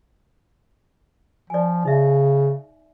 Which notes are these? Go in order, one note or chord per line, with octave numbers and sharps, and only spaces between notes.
F3 D5 G#5
C#3 D#4 E5